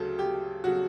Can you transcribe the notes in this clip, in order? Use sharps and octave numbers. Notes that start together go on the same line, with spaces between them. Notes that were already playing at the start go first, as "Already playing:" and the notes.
Already playing: D2 C#3 F#3 A4
G4
C#3 F#3 F#4